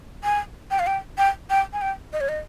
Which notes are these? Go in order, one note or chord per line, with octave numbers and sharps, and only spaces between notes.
G#5
G5
F5
G5
G5
G5
G#5
G5
D#5
C#5
D#5